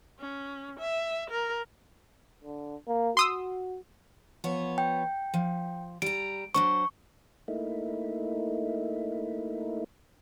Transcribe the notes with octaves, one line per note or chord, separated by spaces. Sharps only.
C#4
E5
A#4
D3
A#3
F#4 C6 D#6 E6
F3 B3 C#5
G5
F3
G3 A#5 D7
F#3 D4 C5 C#6
A3 A#3 D#4 E4